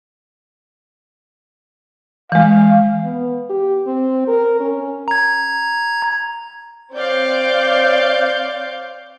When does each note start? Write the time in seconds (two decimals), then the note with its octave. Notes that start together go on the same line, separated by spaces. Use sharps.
2.32 E3 G#3 F5
3.03 B3
3.50 G4
3.86 C4
4.28 A#4
4.60 C#4
5.08 A#5 G#6
6.93 C4 C#5 D5 F5 G6